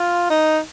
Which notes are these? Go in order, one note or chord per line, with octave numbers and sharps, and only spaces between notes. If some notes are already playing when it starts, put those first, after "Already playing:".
Already playing: F4
D#4